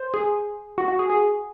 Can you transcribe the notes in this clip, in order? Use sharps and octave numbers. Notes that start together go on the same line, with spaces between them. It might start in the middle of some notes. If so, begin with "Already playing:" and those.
Already playing: C5
G#4
F#4
F#4
G#4
G#4